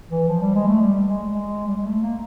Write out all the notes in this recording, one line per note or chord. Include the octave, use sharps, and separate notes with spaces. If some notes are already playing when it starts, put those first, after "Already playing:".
E3
F3
G3
G#3
A3
G3
G#3
G#3
G3
G#3
A3
A#3